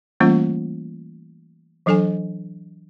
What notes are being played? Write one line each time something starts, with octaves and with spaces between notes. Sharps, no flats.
E3 G3 A3 A#3 C#4 F4
E3 F#3 D4 A4 D#5 G#5